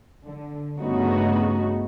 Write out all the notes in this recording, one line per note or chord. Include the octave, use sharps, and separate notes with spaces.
D3
G2 C#3 A3 B3 D#4 F#4